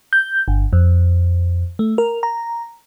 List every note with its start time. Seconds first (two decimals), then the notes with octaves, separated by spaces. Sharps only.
0.13 G6
0.48 G1
0.73 F2
1.79 A3
1.98 A#4
2.23 A#5